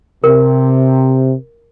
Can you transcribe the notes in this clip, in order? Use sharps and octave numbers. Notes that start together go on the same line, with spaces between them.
C3 A#4